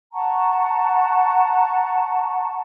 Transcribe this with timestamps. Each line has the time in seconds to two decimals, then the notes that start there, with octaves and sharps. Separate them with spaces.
0.13 F#5 A5 A#5 C#6